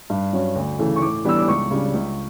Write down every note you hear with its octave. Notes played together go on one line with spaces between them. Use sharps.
G2
F#3 C#4
D2
C#3 E3 A3
C#6
A2 D6
E3 G3 B3 D4 E6
D6
C#2 C#6
C#3 G3 D4
C#2